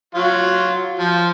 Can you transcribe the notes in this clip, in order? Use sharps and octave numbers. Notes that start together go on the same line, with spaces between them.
F#3 F4 F#4
F3